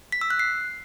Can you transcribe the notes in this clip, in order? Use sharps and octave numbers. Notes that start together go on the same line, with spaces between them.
B6
E6
F#6
C7